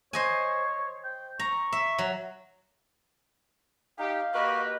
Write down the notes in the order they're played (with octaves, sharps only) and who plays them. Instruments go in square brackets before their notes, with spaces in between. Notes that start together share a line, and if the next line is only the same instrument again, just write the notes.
[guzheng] C5 D#5 G#5 [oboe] C#5
[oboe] G5
[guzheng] A#5 [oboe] C#6
[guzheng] E5
F#3
[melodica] D#4 [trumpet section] G4 [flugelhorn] F5
[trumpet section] A#3 G4 B4 [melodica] F#4 A#4 [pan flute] D#5